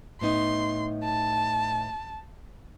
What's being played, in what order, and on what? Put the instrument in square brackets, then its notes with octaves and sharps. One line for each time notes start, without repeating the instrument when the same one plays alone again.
[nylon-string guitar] A2 B3 D#4 [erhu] C6
[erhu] A5